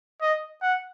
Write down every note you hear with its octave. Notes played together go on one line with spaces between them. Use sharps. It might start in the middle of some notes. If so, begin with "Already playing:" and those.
D#5
F#5